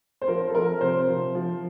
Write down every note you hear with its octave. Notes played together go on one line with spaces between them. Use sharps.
C5
F3 A#4
A4
F3 A#4
C3 C5
F3
F3